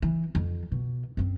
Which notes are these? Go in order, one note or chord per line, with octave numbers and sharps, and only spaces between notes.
E3
F2
B2
F#2 C4